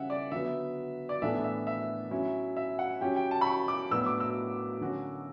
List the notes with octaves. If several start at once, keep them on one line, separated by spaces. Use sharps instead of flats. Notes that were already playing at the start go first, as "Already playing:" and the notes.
Already playing: C#3 G3 C#4 E5 F#5
D5
D3 F#3 B3 E5
D5
A2 E3 B3 D4 A4 E5
E5
E5
F#3 C#4 E4
E5
F#5
F#3 C#4 G4 G5
G5
A5
B5
C#6
D6
A2 F#3 B3 D4 F#4 E6
D6
E6
D3 F#3 C#4 F#4